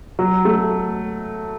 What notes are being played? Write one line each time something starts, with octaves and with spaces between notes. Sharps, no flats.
F#3
A3